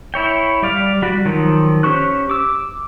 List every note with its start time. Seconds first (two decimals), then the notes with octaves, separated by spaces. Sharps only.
0.14 E4 C#5 G5
0.62 G3 D5 F5
1.02 G3 F#4
1.25 D#3 F3 F#3
1.83 C#4 G4 C5 C#6 F#6
2.30 D6 E6